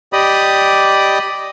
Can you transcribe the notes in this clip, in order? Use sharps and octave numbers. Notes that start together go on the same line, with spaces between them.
G4 D5 D#5 B5 D#6